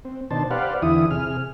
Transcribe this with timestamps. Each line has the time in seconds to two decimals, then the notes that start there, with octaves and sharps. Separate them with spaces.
0.05 C4
0.31 B2 D#3 D4 C5 A5
0.51 G4 B4 C5 D5 F5 F#5
0.82 E2 D3 E3 E4 D#6
1.11 C3 G#4 F6